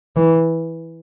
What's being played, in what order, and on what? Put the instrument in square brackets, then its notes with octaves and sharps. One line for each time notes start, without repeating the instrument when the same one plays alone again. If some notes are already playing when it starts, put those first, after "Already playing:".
[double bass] E3